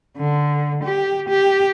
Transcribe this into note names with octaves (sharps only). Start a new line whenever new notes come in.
D3
G4
G4